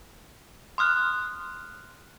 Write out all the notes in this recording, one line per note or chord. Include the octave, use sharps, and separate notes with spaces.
C6 D#6 F6 F#6